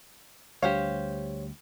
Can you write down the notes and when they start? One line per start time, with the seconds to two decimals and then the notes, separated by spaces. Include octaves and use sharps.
0.63 D2 G3 D4 G4 C5 C#5 F5